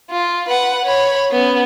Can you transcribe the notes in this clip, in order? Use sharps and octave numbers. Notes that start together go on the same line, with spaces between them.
F4
B4 F#5
C#5 B5
B3 C#4